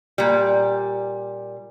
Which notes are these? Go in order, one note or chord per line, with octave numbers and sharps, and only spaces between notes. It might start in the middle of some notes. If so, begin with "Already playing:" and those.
A#2 G3